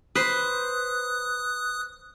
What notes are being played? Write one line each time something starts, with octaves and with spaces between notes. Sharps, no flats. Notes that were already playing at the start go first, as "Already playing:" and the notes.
B4 C5 D#6 F#6